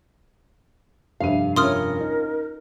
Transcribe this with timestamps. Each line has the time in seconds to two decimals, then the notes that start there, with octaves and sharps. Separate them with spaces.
1.20 F1 G2 F5 D#7
1.56 C#4 F4 A#4 C6 D#6 F6
2.01 D#4